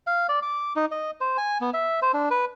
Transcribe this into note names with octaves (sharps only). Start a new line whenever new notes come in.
F5
D5
D6
D#4
D#5
C5
G#5
B3
E5
C5
D4
B4